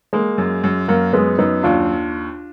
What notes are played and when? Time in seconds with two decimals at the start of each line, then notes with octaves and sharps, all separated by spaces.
0.13 G#3 A#3
0.38 F#2
0.63 F#2
0.88 F#2 A#3
1.13 F#2 G#3 B3
1.38 F#2 B3 D#4
1.63 D#2 D4 F4